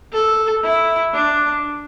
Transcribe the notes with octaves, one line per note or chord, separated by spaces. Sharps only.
A4
E4
D4